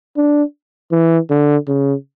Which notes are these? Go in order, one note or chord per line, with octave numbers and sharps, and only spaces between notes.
D4
E3
D3
C#3